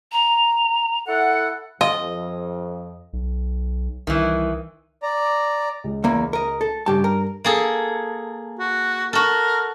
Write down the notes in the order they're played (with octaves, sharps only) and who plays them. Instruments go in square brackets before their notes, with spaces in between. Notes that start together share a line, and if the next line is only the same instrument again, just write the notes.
[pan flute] A#5
[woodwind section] E4 A4 F#5
[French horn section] F2 [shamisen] F4 [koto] D#5
[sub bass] B1
[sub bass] C2 [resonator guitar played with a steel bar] D#3 E3
[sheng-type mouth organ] D5 A#5
[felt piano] C#2
[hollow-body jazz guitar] E2 A#3
A#4 D#5
A4
[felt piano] G2 [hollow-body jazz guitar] C#3 G4 A5
[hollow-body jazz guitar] A#4
[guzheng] A#3 G#4 A4
[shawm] F#4
[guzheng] F#4 A4 [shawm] A#4